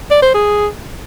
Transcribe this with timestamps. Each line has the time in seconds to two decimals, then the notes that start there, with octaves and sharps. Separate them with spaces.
0.11 D5
0.23 C5
0.35 G#4